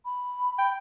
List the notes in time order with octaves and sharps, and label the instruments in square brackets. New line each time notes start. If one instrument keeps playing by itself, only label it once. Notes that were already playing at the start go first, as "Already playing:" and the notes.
[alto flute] B5
[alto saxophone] G5